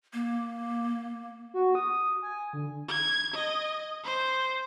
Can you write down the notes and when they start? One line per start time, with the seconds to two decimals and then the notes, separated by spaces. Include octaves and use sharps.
0.13 A#3
1.54 F#4
1.75 D#6
2.23 G#5
2.53 D3
2.89 G#6
3.35 D#5
4.04 C5